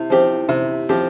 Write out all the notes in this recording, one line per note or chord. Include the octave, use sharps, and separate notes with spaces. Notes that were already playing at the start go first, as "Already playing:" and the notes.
Already playing: C3 E4
F3 C4 G4
C3
F3 C4 G4